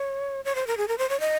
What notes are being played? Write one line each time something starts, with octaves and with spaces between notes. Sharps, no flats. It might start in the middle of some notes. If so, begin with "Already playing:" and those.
Already playing: C#5
C#5
C5
A#4
G#4
A#4
C5
C#5
D#5